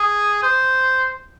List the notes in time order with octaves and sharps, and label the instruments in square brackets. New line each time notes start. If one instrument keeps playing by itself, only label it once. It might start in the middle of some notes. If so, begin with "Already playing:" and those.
Already playing: [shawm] G#4
C5